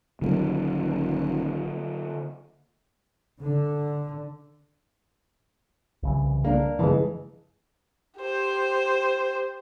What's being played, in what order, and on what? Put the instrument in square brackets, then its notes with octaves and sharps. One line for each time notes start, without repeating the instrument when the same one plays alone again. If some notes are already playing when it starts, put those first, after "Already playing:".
[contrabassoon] D#1 [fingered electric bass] D3 F#3 A#3
[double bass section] D3
[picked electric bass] C2 C#3 E3
[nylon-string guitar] A#3 D4 A#4
[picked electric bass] F#2 C#3 F3 [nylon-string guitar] E3 G#3
[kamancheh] G4 C5